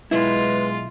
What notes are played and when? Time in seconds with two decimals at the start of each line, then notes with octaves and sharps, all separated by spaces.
0.11 B1 G#3 E4 F4 B4